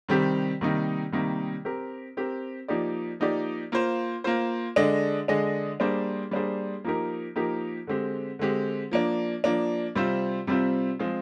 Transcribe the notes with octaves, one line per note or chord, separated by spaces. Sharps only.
C3 D#3 G3 C4 G4
C3 D#3 G3 A#3 D#4
C3 D#3 G3 A#3 D#4
C4 G4 A#4
C4 G4 A#4
F3 A#3 D#4 G4 D5
F3 A#3 D#4 G4 D5
A#3 F4 C5
A#3 F4 C5
D3 G#3 D4 G#4 D#5
D3 G#3 D4 G#4 D#5
G3 A#3 D4 G#4 C5
G3 A#3 D4 G#4 C5
F3 A#3 D#4 G4 A#4
F3 A#3 D#4 G4 A#4
D3 G#3 C4 G4
D3 G#3 C4 G4
F3 A#3 D4
F3 A#3 D4
C3 G3 C4 F4 C5
C3 G3 C4 F4 C5
F3 G#3 C4 F4 G#4